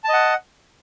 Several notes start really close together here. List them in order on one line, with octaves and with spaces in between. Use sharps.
A5 D#5 F#5